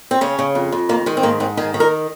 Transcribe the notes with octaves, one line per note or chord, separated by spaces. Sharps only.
C4
C#3 C#4
C#3
F2
F2
D#3 A#3
D#3 G#3
C4
G#2 A#3
G#2 C4
D#3 G#4
D#3
A#4